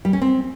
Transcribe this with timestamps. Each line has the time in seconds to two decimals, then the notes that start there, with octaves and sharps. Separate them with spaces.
0.05 G3
0.13 C#4
0.21 C4